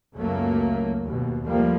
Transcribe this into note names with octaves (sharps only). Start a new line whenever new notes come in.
C#2 F#2 F#3 A3 A#3
D#2 B2
F3 G3 A3 A#3